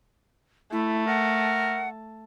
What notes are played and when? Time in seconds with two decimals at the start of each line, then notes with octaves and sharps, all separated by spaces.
0.72 A3 E4
1.07 A#4 F#5